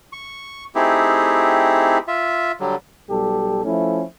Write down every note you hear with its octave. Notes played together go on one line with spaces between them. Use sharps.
C#6
A3 C4 D#4 E4 G4 G#4
F4 E5
D3 F#3 G3
B1 G3 G4 A4
F3 A3 C#4 E4